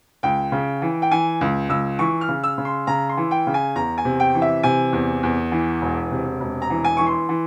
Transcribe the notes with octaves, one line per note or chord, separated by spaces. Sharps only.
C#2 G5
C#3
E3
G5
E3 G#5
C#2
C#2 E6
E3 C#6
F6
C#3
E6
C#3
C6
C#3 A#5
C6
E3
G5
C#3
G#5
E2 A#5
G#5
C3
G5
E3
E5
C3 G#5
E2
E2
E3
E1
C3
E1
A#5
E3
G#5
E3 C#6
C6
E3